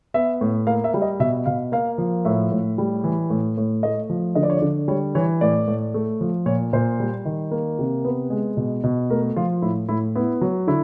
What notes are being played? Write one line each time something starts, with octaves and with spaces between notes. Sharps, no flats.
B3 E5
A2
A#3 F5
E5
G3
D#5
B2 E5
B2 F5
A#3 F5
F3
A2 E5
A2
G3
E3
A2
A2
A3 D#5
F3
D3 D#5
D5
C#5
D5
D3
G3 C#5
E3 C#5
A2 D5
A2
A3
F3
A#2 C#5
A#2 C5
G3
D#3
A#3
C3
B3 B4
G#3
B2
B2
A3 A#4
F3 F4
A2 E4
A2 E4
B3 E4
F#3
D3 E4